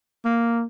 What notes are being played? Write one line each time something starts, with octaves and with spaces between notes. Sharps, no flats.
A#3